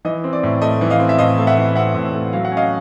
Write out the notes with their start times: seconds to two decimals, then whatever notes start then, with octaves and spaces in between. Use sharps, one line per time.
0.05 E3 D#5
0.24 C4
0.33 D5
0.43 A2
0.62 A3 D#5
0.81 E3
0.90 D#5 F5
1.00 C4
1.09 E5
1.18 A2 D#5 F5
1.38 A3
1.47 E5 F#5
1.58 E3
1.75 C4 E5 F#5
1.95 A2
2.15 A3
2.33 F#3 F5
2.45 F#5
2.52 C#4
2.57 D#5 F5